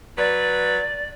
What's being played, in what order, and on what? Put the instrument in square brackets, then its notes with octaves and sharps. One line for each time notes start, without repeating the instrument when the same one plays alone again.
[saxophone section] F#3 B4 [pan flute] D5